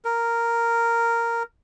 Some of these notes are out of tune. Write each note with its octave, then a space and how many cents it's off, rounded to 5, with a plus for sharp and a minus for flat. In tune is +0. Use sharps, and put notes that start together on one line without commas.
A#4 -5